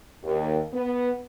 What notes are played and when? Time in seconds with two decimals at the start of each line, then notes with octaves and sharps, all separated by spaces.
0.23 D#2
0.73 B3